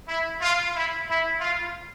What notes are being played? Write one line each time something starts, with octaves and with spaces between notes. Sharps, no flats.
E4
F4
E4
E4
F4